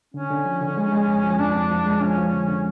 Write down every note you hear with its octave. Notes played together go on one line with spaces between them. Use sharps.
D3 C#4
D3
F3
D3
G#3
G#3
F2
F3
F2 D4
F2
F3
G#3
F3 C#4
F3
D3
D3